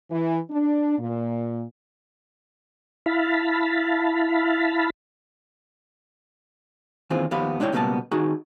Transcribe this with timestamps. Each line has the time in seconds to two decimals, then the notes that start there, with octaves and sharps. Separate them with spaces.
0.10 E3
0.51 D4
0.99 A#2
3.06 E4 F5 A5 B5
7.10 D#2 E3 C4 F4 G#4
7.31 D#2 F3 B3 G4 F5 B5
7.60 G#3 D4 E4 C#5 G5
7.72 C#2 B2 G3 A#3 B3 A5
8.11 D#3 D#4 F#4 G#4